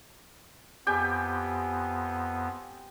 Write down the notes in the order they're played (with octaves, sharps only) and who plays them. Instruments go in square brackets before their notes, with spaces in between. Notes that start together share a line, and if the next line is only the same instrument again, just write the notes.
[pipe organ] F2 B3 [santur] G4 G5 G#5